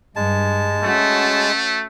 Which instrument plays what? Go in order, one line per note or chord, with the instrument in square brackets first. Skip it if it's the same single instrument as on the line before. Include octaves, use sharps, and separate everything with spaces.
[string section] G2 [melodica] G#3 A5
[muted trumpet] A3 [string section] C#4 F#4